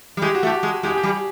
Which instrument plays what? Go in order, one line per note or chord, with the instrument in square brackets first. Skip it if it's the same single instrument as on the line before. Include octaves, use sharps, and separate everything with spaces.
[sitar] G3
[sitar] G#3 [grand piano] G4
[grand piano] F#4
[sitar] A3
[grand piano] G4
[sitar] G#3
[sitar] G#3 [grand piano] G4
[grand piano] G#4
G4
[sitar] G3